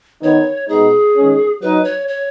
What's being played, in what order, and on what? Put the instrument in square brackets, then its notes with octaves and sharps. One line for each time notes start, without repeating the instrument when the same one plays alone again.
[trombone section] D#3 B3 D#4 [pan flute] C#5
[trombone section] B2 G#3 B3 D#4 [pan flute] G#4
[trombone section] D#3 G#3 C#4
[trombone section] F#3 D#4 [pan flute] B4
[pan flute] C#5
C#5